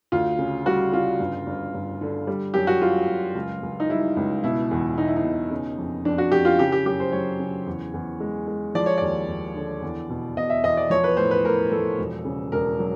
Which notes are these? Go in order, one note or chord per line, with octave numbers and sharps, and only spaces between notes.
D2 F4
C#3
G3 F#4
C#3 F4
G1
G1
G1
D3
G3
F#2 G4
F#4
G3 F4
F#2
C#2
C#2
D#4
G3 E4
C#2
B2 E4
E2
B2 D#4
E4
D#4
B2
C#3
F2
F2 D4
F#4
F2 G4
F4
C#3 G4
G4
F#2 G4
C5
F#3 C#5
C#3
E2
E2
G#3
G#3
F3 D5
C#5
D#2 D5
D#2
D3
E2
B2
B2 D#5
E5
E2 D#5
D5
F3 C#5
B4
A2 C5
B4
A2 A#4
F3 A4
E1
C#3
E1 A#4
F#3